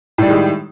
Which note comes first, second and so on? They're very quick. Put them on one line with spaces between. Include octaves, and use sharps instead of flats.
A2 G3 D#3 G#3